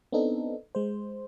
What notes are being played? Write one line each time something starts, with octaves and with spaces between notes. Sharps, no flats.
B3 C4 D4 D#4 A4
G#3 C5